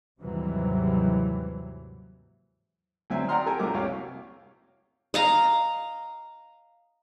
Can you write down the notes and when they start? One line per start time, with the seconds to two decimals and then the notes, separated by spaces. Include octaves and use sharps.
0.21 D#2 G#2 C3 E3 F#3 G3
3.10 D2 F#3 C4 E5 G#5
3.28 D5 F#5 G5 A#5 C6 F6
3.46 G4 A4 A#4 G5 G#5
3.59 A#1 F#2 F#3 E4 A#4 D6
3.74 C2 F#4 C#5 F5 G5
5.14 D#5 F5 A#5